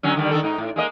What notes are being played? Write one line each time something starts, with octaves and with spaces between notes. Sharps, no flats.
D3 F#3 C#4
D3 D#3 G3
D3 D#3 A4
G#2 D#4
A2
G#3 A#3 D#5